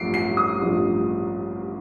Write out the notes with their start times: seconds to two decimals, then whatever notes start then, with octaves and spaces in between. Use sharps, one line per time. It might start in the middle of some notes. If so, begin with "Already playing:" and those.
Already playing: A1 G2 F3 C7 D7
0.14 C7
0.37 D#6
0.59 A1 G2 F3